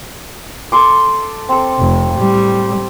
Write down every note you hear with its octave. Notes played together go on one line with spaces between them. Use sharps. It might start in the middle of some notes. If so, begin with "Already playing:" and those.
A4 C6 D6
C4 A4
F1
A2 G3